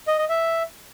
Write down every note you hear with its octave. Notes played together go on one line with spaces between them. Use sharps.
D#5
D#5
E5